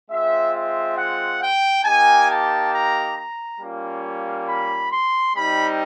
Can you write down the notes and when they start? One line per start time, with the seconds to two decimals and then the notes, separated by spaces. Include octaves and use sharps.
0.10 G#3 C4 F4 E5
0.54 E5
0.98 F#5
1.42 G5
1.85 A#3 D#4 G4 G#5
2.29 A5
2.73 A#5
3.16 A#5
3.60 G3 A#3 C#4 F4
4.47 B5
4.91 C6
5.35 G3 C4 D#4 B5